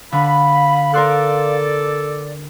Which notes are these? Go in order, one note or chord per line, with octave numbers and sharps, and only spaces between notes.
D3 F5 B5
A4 A#4 D5 C6 F#6